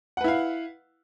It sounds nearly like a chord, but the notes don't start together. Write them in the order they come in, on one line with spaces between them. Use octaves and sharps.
F#5 B4 E4 F5